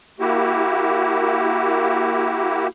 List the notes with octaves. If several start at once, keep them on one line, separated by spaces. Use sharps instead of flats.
A#3 E4 F#4 G4